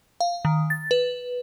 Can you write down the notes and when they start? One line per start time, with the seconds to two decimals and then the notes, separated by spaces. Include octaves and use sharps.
0.20 F5
0.45 D#3
0.70 A6
0.91 B4